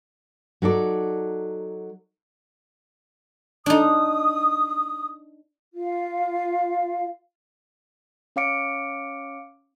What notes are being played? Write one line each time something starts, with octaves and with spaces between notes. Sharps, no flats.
F#3 D#4 A4 D5
D4 D#4 D#6
F4 F5
C#4 C#5 F5 D6 C#7 D7